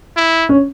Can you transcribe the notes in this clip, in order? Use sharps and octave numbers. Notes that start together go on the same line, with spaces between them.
E4
C#4